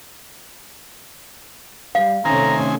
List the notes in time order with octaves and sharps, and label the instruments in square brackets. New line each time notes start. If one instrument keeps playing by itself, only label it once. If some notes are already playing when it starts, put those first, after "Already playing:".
[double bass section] G3 [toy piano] F5
[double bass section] C3 A3 C#4 [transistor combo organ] D#3 C4 G#5 [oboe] A#5